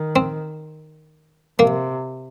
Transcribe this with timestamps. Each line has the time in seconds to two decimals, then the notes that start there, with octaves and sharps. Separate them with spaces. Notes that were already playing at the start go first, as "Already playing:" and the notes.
Already playing: D#3
0.16 C4
1.59 C3 A#3